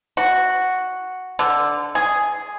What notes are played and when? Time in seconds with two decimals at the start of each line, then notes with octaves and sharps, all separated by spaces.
0.17 F#4
1.39 D3
1.95 G#4